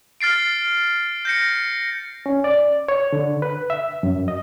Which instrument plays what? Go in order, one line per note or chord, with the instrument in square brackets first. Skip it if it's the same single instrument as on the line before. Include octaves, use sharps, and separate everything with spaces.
[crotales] F6 A6 C7 D7
G6 A#6 C#7
[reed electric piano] C#4
D5
C#5
D3
B4
E5
F#2
D#5